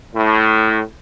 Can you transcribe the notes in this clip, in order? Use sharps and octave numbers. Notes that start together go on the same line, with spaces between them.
A2